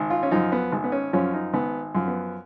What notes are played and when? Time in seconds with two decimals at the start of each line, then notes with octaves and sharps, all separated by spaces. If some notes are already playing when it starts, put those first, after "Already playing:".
Already playing: G#1
0.10 F4
0.23 C#4
0.31 F#2 F3 D#4
0.52 B3
0.72 G#1
0.84 B3
0.92 C#4
1.13 F#2 F3 C#4
1.34 D#4
1.54 G#1 B3
1.95 F#2 F3
2.08 B3